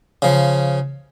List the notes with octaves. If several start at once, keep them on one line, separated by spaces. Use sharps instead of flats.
C#3 F3